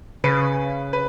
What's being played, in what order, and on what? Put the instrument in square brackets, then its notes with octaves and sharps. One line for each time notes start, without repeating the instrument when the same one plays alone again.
[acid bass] C#3 [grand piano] B4
[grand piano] B4